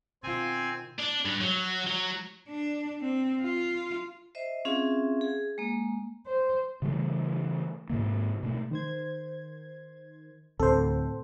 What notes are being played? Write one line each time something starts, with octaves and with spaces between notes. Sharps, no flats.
B2 D#3 C4 F4 G#5
D4
G2
F#3
F#3
D4
C4
F4
C5 D#5 E5
C4 C#4 F4 G#4 E5 F5
G#4
G#3 A#3
C5
C#3 E3 G3 A3
G#2 C3 D#3 A#3
B2 A3
D#3 C5 G#6
D2 A2 C3 C4 A4 C5